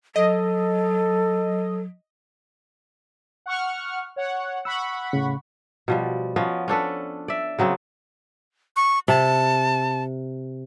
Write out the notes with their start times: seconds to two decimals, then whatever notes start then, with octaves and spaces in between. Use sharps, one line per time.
0.16 F#3 A4 D#5
3.46 F#5 C#6 F6
4.16 C#5 F#5
4.65 F#5 B5 C#6 E6
5.13 A2 C#3
5.88 B2 F3 G3
6.36 F3 B3 C#4 D#5
6.68 C#4 D4 A4 B4
7.28 D5 E5
7.59 C#3 F#3 B3 C4
8.76 C#6
9.08 C3 A5